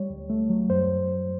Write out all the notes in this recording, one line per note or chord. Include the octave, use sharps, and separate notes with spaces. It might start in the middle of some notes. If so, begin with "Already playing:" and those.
Already playing: G3 C#5
D2
A3
F#3
F#2 C5